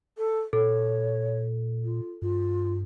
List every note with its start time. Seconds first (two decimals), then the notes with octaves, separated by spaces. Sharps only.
0.17 A4
0.53 A#2 A4 C#5
1.84 F4
2.22 G2 F4